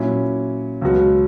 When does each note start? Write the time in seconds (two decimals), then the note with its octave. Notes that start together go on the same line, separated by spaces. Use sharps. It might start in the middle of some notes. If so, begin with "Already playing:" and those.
Already playing: A#2 F#3 C#4 E4
0.81 C#2 B2 F#3 B3 F#4